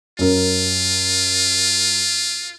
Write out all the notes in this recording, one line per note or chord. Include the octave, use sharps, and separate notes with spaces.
F#2 F4 A#4